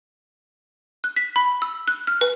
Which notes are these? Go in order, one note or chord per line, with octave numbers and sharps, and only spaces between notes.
F#6
B6
B5
E6
F#6
F6
B4